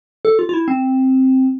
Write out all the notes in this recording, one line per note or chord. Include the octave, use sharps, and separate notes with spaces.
A4
F4
F4
E4
C4